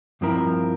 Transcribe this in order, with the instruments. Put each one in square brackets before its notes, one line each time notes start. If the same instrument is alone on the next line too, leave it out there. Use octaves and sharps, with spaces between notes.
[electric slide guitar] G2 F3 C4 E4 A#4